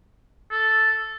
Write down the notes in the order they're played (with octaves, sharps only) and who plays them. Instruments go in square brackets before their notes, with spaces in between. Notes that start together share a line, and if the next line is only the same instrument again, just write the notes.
[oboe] A4